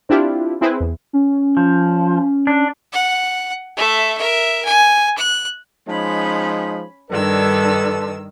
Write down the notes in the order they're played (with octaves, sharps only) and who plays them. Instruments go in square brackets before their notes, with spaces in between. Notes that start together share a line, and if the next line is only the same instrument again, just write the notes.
[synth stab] C4 D4 E4 F4 G4
C4 E4 G#4 B4 C5
E2
[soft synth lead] C#4
[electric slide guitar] F3
D4
[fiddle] F#5
A3 E5
A#4 E5
G#5
F#6
[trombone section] F3 G#3 D#4 [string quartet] C#4 B5
[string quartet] G2 D#3 E6 [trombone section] D4 A4 B4